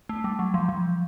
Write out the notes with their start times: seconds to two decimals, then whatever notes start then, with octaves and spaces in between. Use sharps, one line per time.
0.09 A3
0.24 G3
0.39 F#3
0.54 F3
0.69 F3